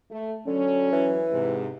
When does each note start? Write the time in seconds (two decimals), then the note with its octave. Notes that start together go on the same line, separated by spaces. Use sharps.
0.11 A3
0.47 D3 F#3 C#4
0.92 E3
1.33 G#2 C3 G#3